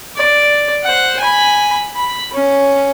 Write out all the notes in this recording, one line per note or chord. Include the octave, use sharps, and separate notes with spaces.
D5
C5 F#5
G#5 B5
B5
C#4